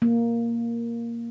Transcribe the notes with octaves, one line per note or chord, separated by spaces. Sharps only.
A#3